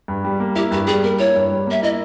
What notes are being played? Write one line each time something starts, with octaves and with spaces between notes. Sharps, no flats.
G2
G3
A#3
E4 G4
G2 G4
G3 G#4
A#3 A#4
E4 C#5
G2
G3
A#3 E5
E4 D#5